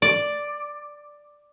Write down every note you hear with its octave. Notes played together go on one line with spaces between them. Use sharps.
D5